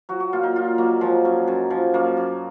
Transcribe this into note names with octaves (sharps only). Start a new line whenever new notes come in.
F#3 F#4
F#4
A#2 F4
D#4
A#2 F4
F#3 A#3
F3 G#3
F#2
F#2
F3
F#2 A#3
F#2